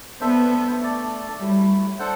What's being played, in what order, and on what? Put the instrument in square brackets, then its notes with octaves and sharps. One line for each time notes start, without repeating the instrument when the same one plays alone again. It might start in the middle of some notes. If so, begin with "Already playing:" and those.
[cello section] B3 [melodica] D4 A4 C5 E5
[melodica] A3 D4 A4 D5
[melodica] F#3 A3 E4 [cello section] G3
[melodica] D4 A4 C5 F#5